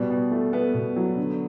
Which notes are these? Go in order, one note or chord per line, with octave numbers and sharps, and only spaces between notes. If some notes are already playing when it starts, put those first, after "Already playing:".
Already playing: B2 G3
B2
A3
A3 B3
B2
F#3
D3